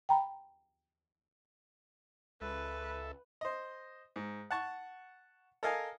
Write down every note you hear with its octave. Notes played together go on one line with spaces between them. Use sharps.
G5 A#5 B5
C#2 A4 B4 E5
C5 D#5
G#2
F#5 A5 C#6
A4 A#4 D#5 F5 G#5